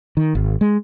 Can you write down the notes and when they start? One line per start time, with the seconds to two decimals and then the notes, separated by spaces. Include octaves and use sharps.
0.17 D#3
0.35 G#1
0.61 G#3